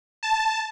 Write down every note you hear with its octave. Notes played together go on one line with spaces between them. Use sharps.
A5